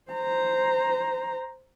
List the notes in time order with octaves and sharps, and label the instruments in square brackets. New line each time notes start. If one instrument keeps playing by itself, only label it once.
[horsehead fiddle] C5 A#5